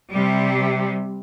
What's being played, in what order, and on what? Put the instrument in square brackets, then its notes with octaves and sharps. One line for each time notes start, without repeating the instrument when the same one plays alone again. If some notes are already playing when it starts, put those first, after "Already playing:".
[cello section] C3 G3